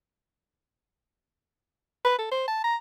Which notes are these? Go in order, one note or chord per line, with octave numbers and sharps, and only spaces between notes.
B4
A4
C5
A5
A#5